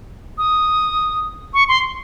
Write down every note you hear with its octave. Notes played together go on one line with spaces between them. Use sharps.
D#6
C#6
C6